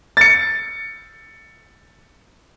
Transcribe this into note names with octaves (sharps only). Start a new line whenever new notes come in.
A6 C#7